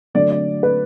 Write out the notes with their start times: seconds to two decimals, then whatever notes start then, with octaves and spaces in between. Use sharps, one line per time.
0.14 D3 F#3 A3 D5
0.30 D5
0.63 B4